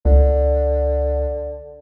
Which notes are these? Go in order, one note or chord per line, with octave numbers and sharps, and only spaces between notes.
C#2 D3